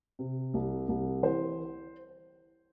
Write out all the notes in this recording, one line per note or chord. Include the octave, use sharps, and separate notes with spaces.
C3
C2
C2
E3 C5